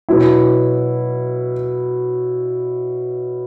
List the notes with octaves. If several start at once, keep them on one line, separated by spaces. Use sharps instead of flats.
B2 F#3 E4